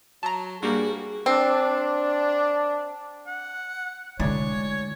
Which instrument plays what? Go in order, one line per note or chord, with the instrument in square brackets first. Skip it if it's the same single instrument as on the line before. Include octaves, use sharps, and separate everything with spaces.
[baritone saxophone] F#3 [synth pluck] A5 A#5
[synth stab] G2 G3 A#3 [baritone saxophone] F#4 [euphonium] G#4
[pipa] C4 [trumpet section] D4
[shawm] F#5
[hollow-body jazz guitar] D2 G#3 D5 [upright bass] D3 E4 [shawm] C#5